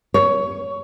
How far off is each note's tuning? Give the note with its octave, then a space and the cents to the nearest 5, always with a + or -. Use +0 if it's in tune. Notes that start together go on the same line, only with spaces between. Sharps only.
C#5 +15